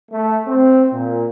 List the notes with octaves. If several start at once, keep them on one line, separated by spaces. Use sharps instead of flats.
A3
C4
A#2